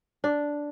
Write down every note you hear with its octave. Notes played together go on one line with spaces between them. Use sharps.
D4